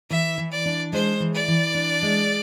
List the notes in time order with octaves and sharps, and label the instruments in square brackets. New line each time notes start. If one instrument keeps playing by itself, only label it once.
[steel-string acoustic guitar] E3 [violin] E5
[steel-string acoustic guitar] E3
[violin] D5
[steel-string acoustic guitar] D4
[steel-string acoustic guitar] G#3 [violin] C5
[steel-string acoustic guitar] E3
[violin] D5
[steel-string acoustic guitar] E3
D4
G#3